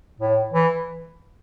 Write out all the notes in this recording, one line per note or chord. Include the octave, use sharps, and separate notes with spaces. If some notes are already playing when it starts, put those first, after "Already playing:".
A2
E3